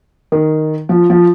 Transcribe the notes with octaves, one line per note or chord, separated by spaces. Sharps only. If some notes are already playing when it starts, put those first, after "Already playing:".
D#3
F3
F3